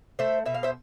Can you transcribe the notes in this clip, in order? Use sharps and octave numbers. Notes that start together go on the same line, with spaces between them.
A3 C5 E5
B2 E5
F5
C5 E5